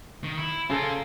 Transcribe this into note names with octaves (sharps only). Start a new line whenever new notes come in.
D#3
E4
C#3 F4 A4 A#4